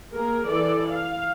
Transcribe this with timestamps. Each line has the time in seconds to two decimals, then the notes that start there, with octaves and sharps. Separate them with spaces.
0.12 A#3 G#4 A#4
0.47 E3 A4 D5
0.89 F5